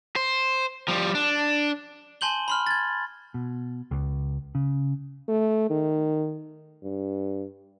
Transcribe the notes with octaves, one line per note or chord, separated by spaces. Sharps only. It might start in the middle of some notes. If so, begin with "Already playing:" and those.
C5
F3 G3
D4
G#5 A5 C6 G6 F#7 G7
B5 C6 F6
G#6 A6
B2
C#2
C#3
A3
D#3
G2